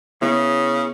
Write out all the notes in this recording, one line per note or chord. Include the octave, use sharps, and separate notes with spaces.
C#3 B3 E4